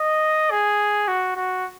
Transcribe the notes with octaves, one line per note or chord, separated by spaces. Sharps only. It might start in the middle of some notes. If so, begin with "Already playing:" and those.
Already playing: D#5
G#4
F#4
F#4